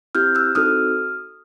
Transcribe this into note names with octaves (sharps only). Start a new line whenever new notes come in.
C4 E4 G4 F6 G6
E6 F#6
C4 D#4 F#4 A4 D#6 F6